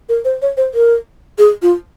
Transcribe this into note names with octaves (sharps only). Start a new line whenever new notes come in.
A#4
C5
C#5
C5
A#4
G#4
F4